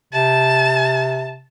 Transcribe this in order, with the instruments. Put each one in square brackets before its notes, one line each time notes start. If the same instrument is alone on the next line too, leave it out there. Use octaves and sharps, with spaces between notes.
[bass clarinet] C3 [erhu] A5